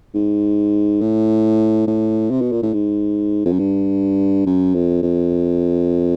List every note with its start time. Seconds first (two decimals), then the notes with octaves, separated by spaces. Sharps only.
0.14 G#2
1.01 A2
1.87 A2
2.31 C3
2.41 B2
2.52 A#2
2.63 A2
2.73 G#2
3.45 F2
3.52 F#2
3.59 G2
4.46 F#2
4.74 F2
5.03 F2